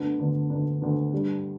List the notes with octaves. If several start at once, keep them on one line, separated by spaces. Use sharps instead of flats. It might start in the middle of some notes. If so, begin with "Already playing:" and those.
Already playing: D2 D3 B3 D4
D2 D3 B3 D4
D2 D3 B3 D4
D2 D3 B3 D4
G2 G3 D4 G4